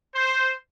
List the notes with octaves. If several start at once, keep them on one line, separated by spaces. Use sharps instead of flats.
C5